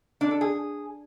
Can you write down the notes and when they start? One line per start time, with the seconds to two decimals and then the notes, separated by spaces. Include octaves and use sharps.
0.21 D4
0.31 A4
0.41 G#4